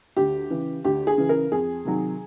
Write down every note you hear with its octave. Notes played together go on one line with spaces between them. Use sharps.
D2 G4
C#3 E3
D2 G4
G#4
C#3 E3
A#4
F2 G#4
C3 D#3 F#3